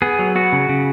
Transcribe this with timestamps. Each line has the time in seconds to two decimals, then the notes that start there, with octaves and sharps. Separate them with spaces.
0.02 B3 G#4
0.19 F#3
0.35 B3 F#4
0.52 C#3
0.69 C#3